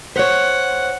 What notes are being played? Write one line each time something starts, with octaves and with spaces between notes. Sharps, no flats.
C5 C#5 F#5